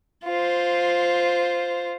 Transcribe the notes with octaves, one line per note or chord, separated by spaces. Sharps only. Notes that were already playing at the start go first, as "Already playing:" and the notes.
F4 C5